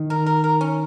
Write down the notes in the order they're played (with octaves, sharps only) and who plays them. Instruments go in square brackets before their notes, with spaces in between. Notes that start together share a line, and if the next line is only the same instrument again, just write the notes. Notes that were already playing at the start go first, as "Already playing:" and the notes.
Already playing: [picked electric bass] D#3
[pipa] A#4
A#4
A#4
C#4